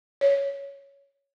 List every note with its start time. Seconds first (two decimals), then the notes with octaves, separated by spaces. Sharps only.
0.21 C#5